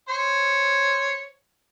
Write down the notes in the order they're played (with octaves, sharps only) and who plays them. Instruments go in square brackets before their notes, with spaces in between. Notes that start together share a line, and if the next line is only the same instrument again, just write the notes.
[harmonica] C5 C#5